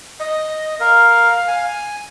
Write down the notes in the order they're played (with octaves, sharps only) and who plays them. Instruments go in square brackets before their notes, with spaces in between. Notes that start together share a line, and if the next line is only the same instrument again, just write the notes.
[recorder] D#5
[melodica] A#4 [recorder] F5
[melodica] G#5